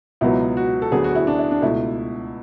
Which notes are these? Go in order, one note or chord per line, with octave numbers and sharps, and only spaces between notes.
C#2 B2 F#3 B3 E4
F#4
A4
D2 D3 F#3 B3 G#4
F#4
E4
D4
E4
D4
C#2 B2 A3 E4